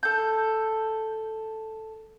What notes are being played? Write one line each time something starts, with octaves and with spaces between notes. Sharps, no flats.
A4 G6